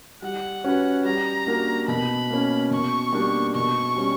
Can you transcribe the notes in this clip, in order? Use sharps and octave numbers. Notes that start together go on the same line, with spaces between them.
G3 F#5
C#4 F#4 B4
G3 A#5
A#3 D4 F#4 A#4
B2 B5
A#3 C#4
B2 C#6
G3 A#3 D4
B2 C#6
G3 C#4